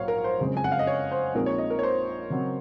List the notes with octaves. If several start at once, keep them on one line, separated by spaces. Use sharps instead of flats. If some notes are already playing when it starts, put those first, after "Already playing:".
Already playing: A#1 G#2 F#3 A#3 C#5 F5
A#4
C5
F#1 F2 C#3 G#3 C#4
G#5
F#5
F5
D#5
C#5
C5
A#1 A#2 G#3 C4 D#4 A#4
C#5
D#5
A#4
C#5
C5
C#3 F#3 C4